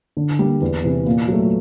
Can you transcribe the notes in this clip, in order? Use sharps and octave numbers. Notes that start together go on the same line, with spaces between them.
D3
G3 A#3
E2
C3 E3
A#2
F#3 A3